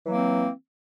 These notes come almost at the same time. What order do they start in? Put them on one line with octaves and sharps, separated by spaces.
E3 F#3 A#3 C4